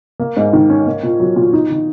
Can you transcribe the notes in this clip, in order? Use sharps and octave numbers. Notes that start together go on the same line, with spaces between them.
A#3
G#2
D#3
C#4
A#3
A#2
F#3
A#2
D#4
D#3